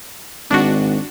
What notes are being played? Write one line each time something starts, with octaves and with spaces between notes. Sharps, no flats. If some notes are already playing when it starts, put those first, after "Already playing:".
G#1 D4 F#4